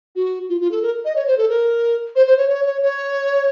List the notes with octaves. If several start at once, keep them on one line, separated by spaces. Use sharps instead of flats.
F#4
F4
F4
A4
A#4
D#5
C#5
C5
A4
A#4
C5
C5
C#5
C#5
C#5
C#5